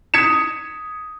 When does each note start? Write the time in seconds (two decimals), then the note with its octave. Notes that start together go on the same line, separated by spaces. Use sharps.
0.14 D#6 G#6 B6 C#7 E7